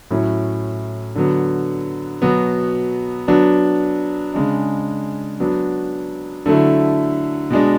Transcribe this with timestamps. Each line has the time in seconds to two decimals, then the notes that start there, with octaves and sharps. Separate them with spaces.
0.11 A2 F#3 C#4 E4
1.15 D3 F#3 B3
2.22 B2 F#3 B3
3.28 F#3 B3 D4
4.34 C#3 G#3 D4
5.40 F#3 B3 D4
6.46 D3 F#3 A3 E4
7.50 B2 G#3 D4